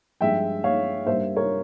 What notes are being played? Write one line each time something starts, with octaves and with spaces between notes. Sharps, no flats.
G2 F3 G#3 E5 G5
C#5 F5
G2 G3 A#3 C5 E5
A#4 C#5